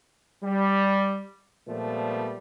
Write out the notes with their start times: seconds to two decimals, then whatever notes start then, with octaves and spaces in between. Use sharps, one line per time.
0.43 G3
1.68 A#2 F3 G3 A3 B3